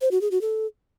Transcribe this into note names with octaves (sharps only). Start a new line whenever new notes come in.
C5
F#4
G#4
F#4
A4